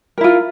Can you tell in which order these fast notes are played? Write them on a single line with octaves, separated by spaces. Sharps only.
A#4 E4 F4